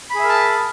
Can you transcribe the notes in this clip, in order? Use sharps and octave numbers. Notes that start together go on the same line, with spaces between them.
G#4 A#4 E5 A5 B5